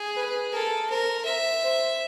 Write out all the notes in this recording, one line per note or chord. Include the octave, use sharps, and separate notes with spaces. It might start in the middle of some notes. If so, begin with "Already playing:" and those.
Already playing: G#4
B4
A4 A#4
A#4 C5
C5 E5
C5